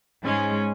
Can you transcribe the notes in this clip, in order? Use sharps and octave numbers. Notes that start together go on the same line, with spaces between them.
G#2 G#3 C#4 G#5